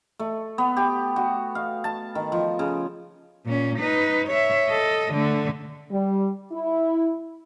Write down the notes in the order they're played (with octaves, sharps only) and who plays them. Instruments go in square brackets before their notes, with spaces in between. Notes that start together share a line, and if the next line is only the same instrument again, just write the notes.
[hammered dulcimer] A3
B3
G4
F#4
F5
A5
D#3
F3
C#3
[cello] A#2 C#4
D#4 B4
C#5 E5
A4 D#5
D3 A3
[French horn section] G3
E4